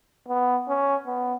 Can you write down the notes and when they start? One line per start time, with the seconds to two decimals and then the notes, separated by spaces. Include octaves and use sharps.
0.28 B3
0.68 C#4
1.07 B3